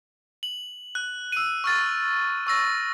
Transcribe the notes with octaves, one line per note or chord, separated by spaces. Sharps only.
F#7
F#6
E6 D#7
C#6 F6 A6
C#6 E6 A#6